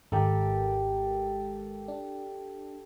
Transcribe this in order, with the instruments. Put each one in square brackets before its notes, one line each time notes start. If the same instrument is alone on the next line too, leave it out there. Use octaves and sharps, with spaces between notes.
[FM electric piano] G#1 G#3 A#4 [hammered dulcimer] G4 A4
[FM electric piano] D4